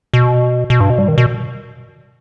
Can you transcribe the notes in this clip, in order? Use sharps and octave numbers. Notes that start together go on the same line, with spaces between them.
B2
B2
G2
B2
G3
D#3
B2